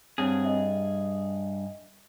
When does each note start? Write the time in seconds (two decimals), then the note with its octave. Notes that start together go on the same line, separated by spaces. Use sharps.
0.18 G2 C4 G#4 C#5 G#5
0.44 D#5 E5